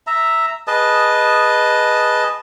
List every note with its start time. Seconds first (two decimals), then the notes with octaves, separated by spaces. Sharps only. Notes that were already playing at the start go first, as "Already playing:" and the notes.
0.07 E5 A#5
0.67 G#4 B4 D#5 A5